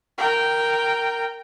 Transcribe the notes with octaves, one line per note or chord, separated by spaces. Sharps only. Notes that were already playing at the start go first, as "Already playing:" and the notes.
A#4 G5